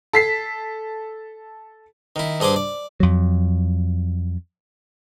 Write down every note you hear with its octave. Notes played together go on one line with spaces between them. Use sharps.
A4 B6 C7
D#3 E4
G2 G#4 C5 G#5 D6
D5
F2 F#3